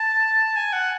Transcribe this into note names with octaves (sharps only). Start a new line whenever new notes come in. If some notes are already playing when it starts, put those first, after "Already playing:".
Already playing: A5
G#5
F#5